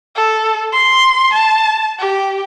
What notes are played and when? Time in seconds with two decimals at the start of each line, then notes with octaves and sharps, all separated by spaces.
0.16 A4
0.72 C6
1.33 A5
1.99 G4